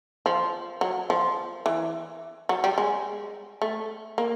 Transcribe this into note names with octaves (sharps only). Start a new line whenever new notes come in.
F3
F#3
F3
E3
F#3
G3
G#3
A3
A#3